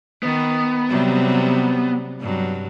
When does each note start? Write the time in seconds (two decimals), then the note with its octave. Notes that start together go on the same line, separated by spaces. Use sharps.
0.23 D#3 B3
0.89 C3 F#3 G3
2.20 G2 F#3